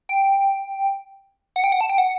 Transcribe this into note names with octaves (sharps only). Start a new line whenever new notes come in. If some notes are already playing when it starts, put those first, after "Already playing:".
G5
F#5
G5
F#5
A5
G5
F#5